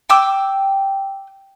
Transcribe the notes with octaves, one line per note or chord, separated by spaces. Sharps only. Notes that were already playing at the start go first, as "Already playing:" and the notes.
G5 D6 E6